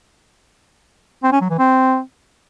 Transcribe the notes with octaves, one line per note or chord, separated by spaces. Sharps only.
C4
C#4
F#3
E3
C4